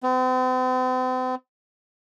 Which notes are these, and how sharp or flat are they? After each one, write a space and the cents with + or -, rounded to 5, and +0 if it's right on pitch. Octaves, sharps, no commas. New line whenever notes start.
C4 -40